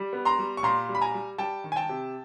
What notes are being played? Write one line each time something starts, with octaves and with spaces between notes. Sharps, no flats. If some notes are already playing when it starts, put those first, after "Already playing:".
Already playing: G3
B3
A#5 C6
G3
C#6
A#2 A#5 C6
G3
B5
G#5 A#5
G3
G3 G5 A5
D#3
G#5
G5 A5
C3